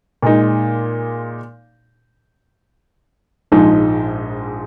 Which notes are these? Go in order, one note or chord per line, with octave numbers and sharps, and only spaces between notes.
A#2 G#3 D#4
A#1 G#2 F3 G#3 D#4